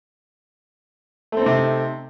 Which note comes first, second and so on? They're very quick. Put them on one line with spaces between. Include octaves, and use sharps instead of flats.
A3 C4 D#4 C3